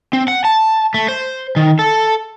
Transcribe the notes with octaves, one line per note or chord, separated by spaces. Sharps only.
C4
F#5
A5
A3
C5
D#3
A4